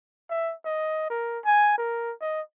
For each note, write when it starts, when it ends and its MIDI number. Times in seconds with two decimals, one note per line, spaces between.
0.30 0.54 76
0.65 1.06 75
1.10 1.39 70
1.45 1.77 80
1.78 2.13 70
2.21 2.41 75